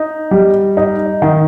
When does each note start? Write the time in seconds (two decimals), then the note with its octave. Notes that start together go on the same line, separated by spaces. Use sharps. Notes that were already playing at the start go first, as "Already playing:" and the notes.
Already playing: D#4
0.31 G3
0.77 D#4
1.22 D#3